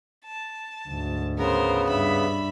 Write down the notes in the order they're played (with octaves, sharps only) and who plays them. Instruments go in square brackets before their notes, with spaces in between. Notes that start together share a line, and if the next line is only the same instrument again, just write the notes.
[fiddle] A5
[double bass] D2 G#2
[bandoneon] C#3 B3 [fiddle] A#4 C5
[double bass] G2 D4 [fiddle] E5 B5